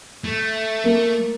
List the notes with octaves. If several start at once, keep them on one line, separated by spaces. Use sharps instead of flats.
A3
A#3